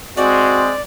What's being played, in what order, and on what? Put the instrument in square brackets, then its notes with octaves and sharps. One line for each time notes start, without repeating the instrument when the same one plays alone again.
[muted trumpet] G#3 [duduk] C4 [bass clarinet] F#4 [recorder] D5